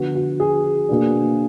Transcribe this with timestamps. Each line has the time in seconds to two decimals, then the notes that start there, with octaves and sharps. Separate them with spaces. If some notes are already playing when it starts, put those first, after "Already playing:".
Already playing: D3 F3 B3 F#4
0.15 F#4
0.40 G#4
0.89 B2 A#3 D4